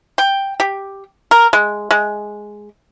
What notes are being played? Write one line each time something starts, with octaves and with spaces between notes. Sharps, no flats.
G5
G4
A#4
G#3
G#3